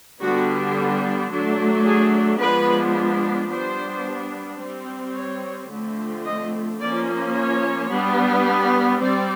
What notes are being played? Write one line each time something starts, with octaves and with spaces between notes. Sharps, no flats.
D3 G3 B3 D4 F#4
F#3 A3 D4
G#4
F3 G#3 B3 D4 B4
G3 B3 D4 C5
G3 C4
C#5
D3 F3 A3 C4
D#5
F3 A#3 C#4 D5
C#5
G3 B3 D4
G3 C4 D5